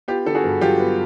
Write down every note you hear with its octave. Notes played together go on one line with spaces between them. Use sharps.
B3 F4 G4
D3 A4
F#4 G#4
G2
F#3 F4 G4
B3